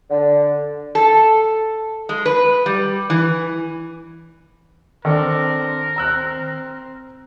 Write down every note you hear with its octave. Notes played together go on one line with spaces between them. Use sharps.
D3
A4
G#3
B4
G3
E3
D#3 C4 D4 A4 A#4
C4 A#5 E6 F#6